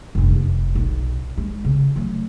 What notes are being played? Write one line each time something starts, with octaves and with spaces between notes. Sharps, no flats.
F1 G2
F1
B1
G#3
C#3
F#3 A3